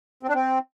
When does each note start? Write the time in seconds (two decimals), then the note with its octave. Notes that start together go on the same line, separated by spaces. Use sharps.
0.23 C4
0.29 D4
0.34 C4